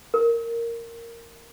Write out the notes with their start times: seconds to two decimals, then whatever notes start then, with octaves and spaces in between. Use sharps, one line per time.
0.14 A#4